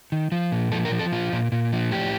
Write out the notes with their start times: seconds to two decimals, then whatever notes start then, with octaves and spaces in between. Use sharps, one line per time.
0.12 D#3
0.32 F3
0.52 A#2
0.72 F3 A4
0.85 A#4
0.92 F3
0.99 A4
1.12 A#2 F4
1.33 A#2
1.52 A#2
1.73 F3
1.92 A2 G4